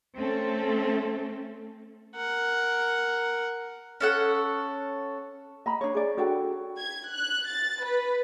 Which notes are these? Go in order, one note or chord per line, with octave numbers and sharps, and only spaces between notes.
A3 C4 C#4 A4
A#4 F#5
C#4 A4 F#5
D#5 A#5 B5
D4 C#5
G#4 D5
D4 F#4 A4 G5
G#6
F#6
A6
B4